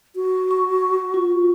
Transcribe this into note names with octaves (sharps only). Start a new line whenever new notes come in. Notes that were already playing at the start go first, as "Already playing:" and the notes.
F#4
C#6
F4